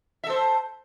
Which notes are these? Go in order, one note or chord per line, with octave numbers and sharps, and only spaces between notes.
A4 C5 E5